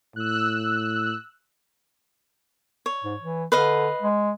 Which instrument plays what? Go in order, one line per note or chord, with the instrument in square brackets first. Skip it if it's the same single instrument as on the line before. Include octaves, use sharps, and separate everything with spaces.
[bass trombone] A2 [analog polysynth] E6 F#6
[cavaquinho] C#5
[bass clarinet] G#2
E3
[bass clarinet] D3 [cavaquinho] B4 D#5 F5
[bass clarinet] G#3